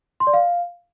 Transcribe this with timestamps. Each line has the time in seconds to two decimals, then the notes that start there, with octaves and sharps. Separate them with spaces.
0.20 C6
0.27 D5
0.33 F5